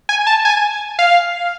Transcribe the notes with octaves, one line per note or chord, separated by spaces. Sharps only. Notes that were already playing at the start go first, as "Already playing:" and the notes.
G#5
A5
G#5
F5